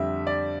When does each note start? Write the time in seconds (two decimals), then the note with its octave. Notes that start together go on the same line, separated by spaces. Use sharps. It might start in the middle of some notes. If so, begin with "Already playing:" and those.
Already playing: F2 D3 G3 E5
0.27 D5